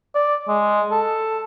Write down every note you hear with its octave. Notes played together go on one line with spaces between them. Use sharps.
D5
G#3
A4